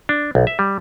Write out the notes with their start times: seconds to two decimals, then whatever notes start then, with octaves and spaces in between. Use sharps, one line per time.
0.09 D4
0.35 B1
0.47 E5
0.59 G3